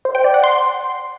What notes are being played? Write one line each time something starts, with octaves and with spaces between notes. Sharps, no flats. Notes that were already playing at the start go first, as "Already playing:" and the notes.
C5
G5
D5
F#5
C6